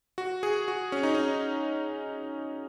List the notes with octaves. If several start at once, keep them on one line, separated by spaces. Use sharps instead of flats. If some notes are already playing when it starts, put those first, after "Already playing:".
F#4
G#4
F#4
C#4
D#4
C#4